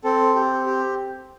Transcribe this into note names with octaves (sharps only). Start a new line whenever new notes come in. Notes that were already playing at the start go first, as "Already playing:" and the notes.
C4 A4
G4
G4